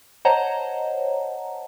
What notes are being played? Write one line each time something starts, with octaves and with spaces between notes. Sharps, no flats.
C5 C#5 D#5 F#5 A5 A#5